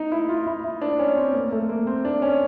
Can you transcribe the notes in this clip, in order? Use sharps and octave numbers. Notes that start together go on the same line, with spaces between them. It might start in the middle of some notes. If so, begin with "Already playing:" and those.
Already playing: D#4
E4
F4
E4
E4
D4
C#4
C4
A#3
A#3
A3
A#3
C4
D4
C#4